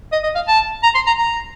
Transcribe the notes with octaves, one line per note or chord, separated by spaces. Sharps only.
D#5
D#5
F5
A5
A#5
C6
A#5
A#5